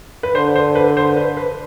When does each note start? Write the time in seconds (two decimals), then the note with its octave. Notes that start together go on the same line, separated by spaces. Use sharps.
0.23 B4
0.34 D3 C5
0.56 C5
0.75 B4
0.97 C5
1.17 B4
1.37 B4